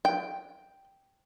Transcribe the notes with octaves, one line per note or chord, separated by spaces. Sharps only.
G5